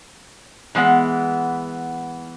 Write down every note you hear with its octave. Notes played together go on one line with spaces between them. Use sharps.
E3 G#3 B3 F#5